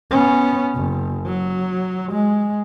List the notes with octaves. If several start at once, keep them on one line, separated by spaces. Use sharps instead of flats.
B3 C#4
F#1
F#3
G#3